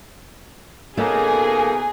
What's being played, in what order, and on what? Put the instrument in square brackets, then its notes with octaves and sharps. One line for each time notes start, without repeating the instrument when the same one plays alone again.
[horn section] B2 A#3 D#4 [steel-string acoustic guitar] A3 C#4 [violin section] G#4